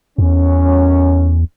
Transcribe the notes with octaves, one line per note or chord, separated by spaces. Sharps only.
E2 C#4